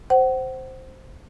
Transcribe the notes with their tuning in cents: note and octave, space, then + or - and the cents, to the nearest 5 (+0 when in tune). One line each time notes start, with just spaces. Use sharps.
C5 +0 F#5 +30